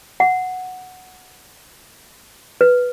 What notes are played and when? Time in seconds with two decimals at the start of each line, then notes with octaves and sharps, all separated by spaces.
0.20 F#5
2.61 B4